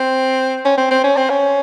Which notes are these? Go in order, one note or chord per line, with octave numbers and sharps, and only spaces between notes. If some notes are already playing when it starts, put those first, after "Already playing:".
Already playing: C4
C#4
C4
C4
C#4
C4
C#4